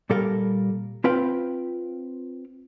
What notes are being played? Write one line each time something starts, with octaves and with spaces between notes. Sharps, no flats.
A#2 G3 A4 A#4 F5
C4 F4 B4 F5 G5